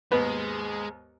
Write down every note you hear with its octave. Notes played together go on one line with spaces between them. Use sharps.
D#2 G#2 G#3 B3 B4